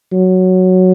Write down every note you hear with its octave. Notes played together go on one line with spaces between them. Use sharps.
F#3